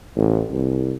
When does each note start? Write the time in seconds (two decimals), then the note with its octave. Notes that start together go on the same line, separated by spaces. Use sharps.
0.17 A1
0.51 C2